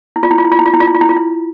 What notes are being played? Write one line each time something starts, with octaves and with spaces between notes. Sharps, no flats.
E4
F4
E4
F4
E4
F4
E4
F4
E4
F4
E4
F4
E4
F4
E4